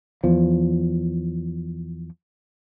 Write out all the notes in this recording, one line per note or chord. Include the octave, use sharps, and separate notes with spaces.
E2 F3